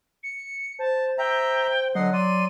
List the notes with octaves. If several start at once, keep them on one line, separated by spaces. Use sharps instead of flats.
C#7
C5 A5
E5 G5 A#5
D3 F#3 D#5 F#5 C7
F#3 D5 C6 D#7